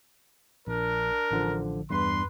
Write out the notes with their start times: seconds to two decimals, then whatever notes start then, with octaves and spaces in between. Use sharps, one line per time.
0.67 A#1 D4 A#4
1.31 A1 D3 F3
1.90 E2 G2 B4 C6